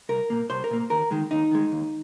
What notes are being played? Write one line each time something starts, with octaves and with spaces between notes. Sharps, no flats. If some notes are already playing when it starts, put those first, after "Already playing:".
C2 A#4
A#2 A#3
C2 C5
A#4
A#2 A#3
D#2 A#4
D#3 G#3
D#2 D#4
D#3 G#3
D#2